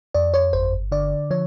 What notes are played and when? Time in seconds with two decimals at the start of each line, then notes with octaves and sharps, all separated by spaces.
0.14 F2 D5
0.34 C#5
0.53 G1 C5
0.92 D3 D5
1.31 F3 C#5